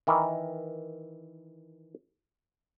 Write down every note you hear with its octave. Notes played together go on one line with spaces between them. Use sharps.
D#3 E3 A#4